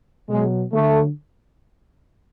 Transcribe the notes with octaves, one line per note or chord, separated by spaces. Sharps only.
B2 F#3 G#3
D3 F#3 A3